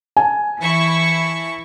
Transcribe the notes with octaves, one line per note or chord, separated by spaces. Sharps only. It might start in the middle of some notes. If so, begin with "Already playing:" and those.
G#5 A5
E3 E4 C#6